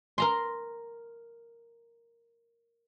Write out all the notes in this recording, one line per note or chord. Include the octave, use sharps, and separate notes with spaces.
A#4 A#5 C6